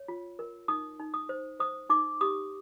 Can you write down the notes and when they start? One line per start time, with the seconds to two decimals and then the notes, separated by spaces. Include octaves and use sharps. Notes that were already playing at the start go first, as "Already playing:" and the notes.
Already playing: C#5
0.08 F4
0.39 A#4
0.68 D#4 D#6
1.00 D#4
1.14 D#6
1.29 C5
1.59 C5 D#6
1.89 D#4 D6
2.21 G4 D#6